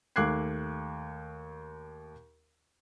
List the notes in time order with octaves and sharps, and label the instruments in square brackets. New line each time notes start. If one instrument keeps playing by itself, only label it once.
[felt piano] D#2 A3 D6 F#6 G#6 C7